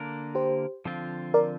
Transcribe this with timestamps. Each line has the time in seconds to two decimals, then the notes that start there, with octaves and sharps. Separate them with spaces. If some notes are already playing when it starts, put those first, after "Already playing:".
Already playing: D3 A#3 D4 A#4
0.35 G4 C5
0.85 D3 F3 C4 F4
1.34 A#4 D5